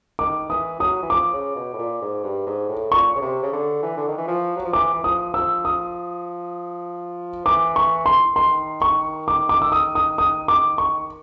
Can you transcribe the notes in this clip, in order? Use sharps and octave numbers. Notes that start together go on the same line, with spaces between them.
D#3 D6
E3 D#6
F#3 D#6
E3
F3 D6
C#3
B2
A2
A#2
G#2
G2
G#2
A2
A#2 C#6
C#3
C3
C#3
D3
E3
D3
D#3
E3
F3
F#3
F3
E3 D6
E3
F3 D#6
F3 E6
D#6
E3 D6
C#6
C6
D#3 C6
C#6
D6
D6
E6
D#6
D#6
D#6
D6
C#6